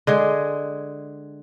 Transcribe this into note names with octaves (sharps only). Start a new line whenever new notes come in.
D3 G#3 G#4